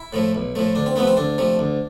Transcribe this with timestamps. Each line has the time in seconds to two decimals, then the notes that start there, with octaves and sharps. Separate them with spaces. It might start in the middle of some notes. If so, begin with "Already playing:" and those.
Already playing: E4
0.13 A2 F3 A3
0.35 B1
0.55 A2 F3 A3
0.75 D2 D4
0.86 C4
0.96 C3 F3 A3 B3
1.07 C4
1.17 D2 D4
1.38 C3 F3 A3
1.59 D2